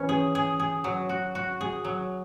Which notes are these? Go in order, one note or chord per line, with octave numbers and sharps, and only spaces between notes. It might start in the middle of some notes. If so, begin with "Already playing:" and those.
Already playing: E3 C#4
G#4
G#4
G#4
F#3
F#4
F#4
G#4
F#3